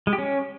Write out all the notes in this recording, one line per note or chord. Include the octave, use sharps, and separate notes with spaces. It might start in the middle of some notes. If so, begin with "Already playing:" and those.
G#3
G4
C#4